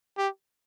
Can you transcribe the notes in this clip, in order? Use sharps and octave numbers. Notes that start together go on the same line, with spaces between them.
G4